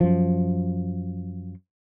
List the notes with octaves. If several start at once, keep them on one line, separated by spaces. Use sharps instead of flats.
F#2 F3